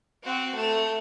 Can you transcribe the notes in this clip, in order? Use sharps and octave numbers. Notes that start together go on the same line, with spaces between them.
C4 F#4
A3